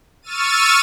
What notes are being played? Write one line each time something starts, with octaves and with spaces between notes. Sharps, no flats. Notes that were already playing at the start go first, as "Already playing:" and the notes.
C#6 E6 F6 A6 D#7